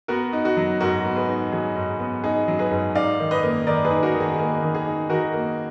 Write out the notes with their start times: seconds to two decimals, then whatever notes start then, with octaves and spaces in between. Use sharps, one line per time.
0.08 B3 F#4 A#4
0.33 D#4
0.45 F#4
0.57 F#3
0.81 G#2 F#4 A#4
1.05 B3
1.16 G#4 B4
1.29 D#4
1.52 F#3 G#4
1.76 G#2
2.00 B3
2.24 D#4 G#4
2.48 F#3
2.59 G#4 B4
2.71 G#2
2.95 D#4 D5 F5
3.19 D#3
3.31 B4 D#5
3.43 A#3
3.67 D#3 A#4 D5
3.85 G#4 B4
3.90 D#4
4.03 F#4 A#4
4.14 D#3
4.20 G#4
4.39 A#3 G#4
4.62 D#3
4.75 G#4
4.86 D#4
5.10 D#3 F#4 A#4
5.33 A#3